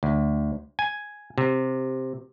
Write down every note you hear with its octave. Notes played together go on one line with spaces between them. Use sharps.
D2
G#5
C3